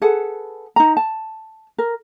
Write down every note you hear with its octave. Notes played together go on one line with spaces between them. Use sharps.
G#4 A4 B4 F#5
D#4 A#5
A5
A#4